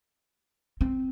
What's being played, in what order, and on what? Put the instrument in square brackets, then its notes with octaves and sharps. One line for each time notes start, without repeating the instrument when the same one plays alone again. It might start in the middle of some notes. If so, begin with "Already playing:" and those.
[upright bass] C4